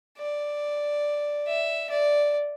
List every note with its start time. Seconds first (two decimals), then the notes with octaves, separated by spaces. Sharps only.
0.18 D5
1.47 E5
1.90 D5